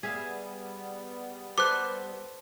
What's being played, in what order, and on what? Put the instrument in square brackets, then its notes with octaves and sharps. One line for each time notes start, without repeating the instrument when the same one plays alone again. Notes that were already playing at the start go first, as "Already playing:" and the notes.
[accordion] G3 B3 [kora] G#4 E5 F5
[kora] A4 B4 C5 [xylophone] D6 F#6